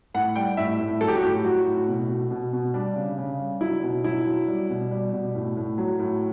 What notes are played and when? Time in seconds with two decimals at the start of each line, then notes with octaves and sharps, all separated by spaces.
0.14 A2 F#5
0.36 G3 G5
0.57 A2 E5
0.80 A2
1.01 F#3 A4
1.08 G4
1.16 F#4
1.23 A2 G4
1.44 F#3 F#4
1.66 A2
1.88 B2
2.09 B2
2.31 B2
2.53 B2
2.74 G3 D4
2.96 C#3
3.18 C#3
3.40 G3
3.61 F#3 E4
3.83 B2
4.04 F#3 E4
4.26 F#3
4.48 G3
4.70 B2
4.91 G3
5.13 B2
5.35 A2
5.56 A2
5.78 F#3
5.99 A2